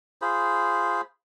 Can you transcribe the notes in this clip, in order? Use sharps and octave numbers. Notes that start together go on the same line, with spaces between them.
F4 G#4 C5 B5